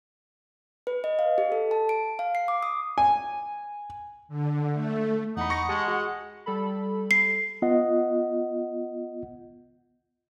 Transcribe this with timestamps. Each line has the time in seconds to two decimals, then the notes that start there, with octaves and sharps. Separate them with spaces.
0.87 B4
1.04 D#5
1.19 F5
1.38 G4
1.52 A4
1.71 A5
1.89 D7
2.19 F5
2.35 C7
2.48 D6
2.63 D#6
2.98 G#5
4.28 D3
4.72 A3
5.37 E2 D#4 F#5 B5
5.50 C#6 A#6 C#7
5.69 G#3 G4 A5 D#6
5.88 F#4 G#4
6.46 G3 A4 B5
7.11 C7
7.62 B3 F4 D#5 F#5